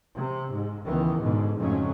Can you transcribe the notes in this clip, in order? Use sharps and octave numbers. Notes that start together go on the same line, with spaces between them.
C3
G#2
C#2 D#3 E3 B3
G#2 B2 D3
F2 G#2 C#3 F#3 A3 C#4